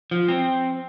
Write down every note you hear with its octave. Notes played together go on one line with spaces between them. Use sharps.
F3
C4